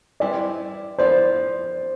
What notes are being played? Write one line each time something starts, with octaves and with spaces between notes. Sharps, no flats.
E3 G3 C4 E4 B4 D5
F3 B3 E4 B4 C5 D5